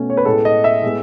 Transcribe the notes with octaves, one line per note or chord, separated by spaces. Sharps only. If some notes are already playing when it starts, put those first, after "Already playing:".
Already playing: B2 A3 C#4
C#5
B4
A2 G#3 B3 A4
D#5
E5
A2 G#3 B3